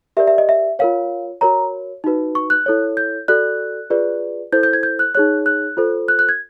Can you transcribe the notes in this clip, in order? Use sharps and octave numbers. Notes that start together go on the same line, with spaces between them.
G4 A#4 D5 E5
E5
D#5
E5
F4 A#4 C#5 F5
F#4 A#4 C#5 A#5
D#4 F#4 B4
C#6
F#6
E4 A4 C#5
G6
F#4 A4 D5 F#6
F4 G#4 B4 D5
E4 A4 C5 G6
G6
G#6
G6
F#6
D#4 G#4 C#5 F#6
F#6
F4 A4 C5
F#6
F#6
G#6